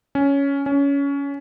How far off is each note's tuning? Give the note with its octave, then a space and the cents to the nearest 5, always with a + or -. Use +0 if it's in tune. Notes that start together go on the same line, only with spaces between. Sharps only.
C#4 +10
C#4 +20